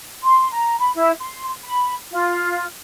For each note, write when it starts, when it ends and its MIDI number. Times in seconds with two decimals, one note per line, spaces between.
0.23 0.47 84
0.51 0.75 82
0.78 0.90 83
0.95 1.11 64
1.20 1.48 84
1.64 1.93 83
2.11 2.63 65